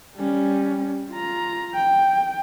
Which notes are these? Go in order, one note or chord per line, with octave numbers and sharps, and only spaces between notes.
G3 C#4
F4 A#5
G5